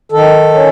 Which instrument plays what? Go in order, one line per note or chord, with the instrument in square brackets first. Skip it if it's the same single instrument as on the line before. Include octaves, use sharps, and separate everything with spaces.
[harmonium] D#3 A4
C#4